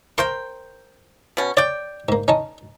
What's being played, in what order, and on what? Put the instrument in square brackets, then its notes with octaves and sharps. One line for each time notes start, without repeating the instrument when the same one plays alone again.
[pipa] A#4 C5 G5 [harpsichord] C6 C#6
[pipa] B2 C#4
[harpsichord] C#5 [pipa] D5 G5
[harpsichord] G#2 A#3
C#4 D#4 A5